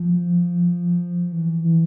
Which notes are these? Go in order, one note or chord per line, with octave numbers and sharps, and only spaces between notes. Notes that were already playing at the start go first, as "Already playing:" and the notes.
Already playing: F3
E3
E3